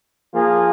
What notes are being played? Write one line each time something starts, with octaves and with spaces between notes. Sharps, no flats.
F3 A#3 F4 G#4